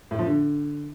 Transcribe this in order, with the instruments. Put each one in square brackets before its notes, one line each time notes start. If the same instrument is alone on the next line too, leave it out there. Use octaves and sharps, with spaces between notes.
[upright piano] A2
F3
D3